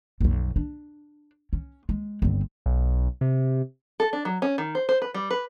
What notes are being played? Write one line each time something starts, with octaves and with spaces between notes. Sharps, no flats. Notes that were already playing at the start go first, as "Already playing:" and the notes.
B1 F2
D4
C#4
G#3
G1 C4
B1
C3
A4
D4
F#3
C#4
D#3
C5
C5
B4
G3
B4